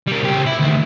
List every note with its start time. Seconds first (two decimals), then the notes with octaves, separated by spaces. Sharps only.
0.07 G3 A#4
0.23 C#3 G4
0.46 E4
0.59 D2 D#3